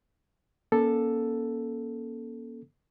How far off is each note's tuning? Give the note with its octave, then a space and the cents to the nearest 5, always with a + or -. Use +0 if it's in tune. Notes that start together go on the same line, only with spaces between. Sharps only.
A#3 +30 C#4 +5 A4 +0